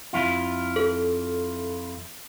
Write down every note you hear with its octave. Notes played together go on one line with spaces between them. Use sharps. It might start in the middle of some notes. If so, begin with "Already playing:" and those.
F2 E4 F4
A4